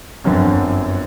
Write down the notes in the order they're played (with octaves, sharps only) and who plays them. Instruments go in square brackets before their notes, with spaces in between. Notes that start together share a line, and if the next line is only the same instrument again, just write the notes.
[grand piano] G1 F#2 D3 F#3 C4